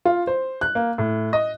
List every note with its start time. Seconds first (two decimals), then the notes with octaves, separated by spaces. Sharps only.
0.05 F4
0.27 C5
0.61 F#6
0.75 A#3
0.98 A2
1.33 D#5